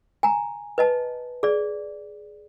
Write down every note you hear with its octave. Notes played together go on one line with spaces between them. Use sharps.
G#5 A#5
B4 D#5 A5
G#4 D5